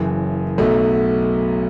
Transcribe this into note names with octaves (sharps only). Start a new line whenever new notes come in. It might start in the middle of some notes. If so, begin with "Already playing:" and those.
Already playing: F#1 F#2 E3
B1 B2 F#3 A3